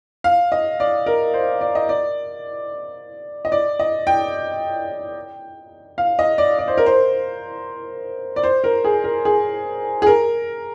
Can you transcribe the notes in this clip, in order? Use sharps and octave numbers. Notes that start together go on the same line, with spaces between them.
F5
D#5
D5
A#4
C5
D5
D#5
D5
D#5
D5
D#5
G5
F5
D#5
D5
D5
C5
A#4
C5
D5
C5
A#4
G#4
A#4
G#4
G#4
A#4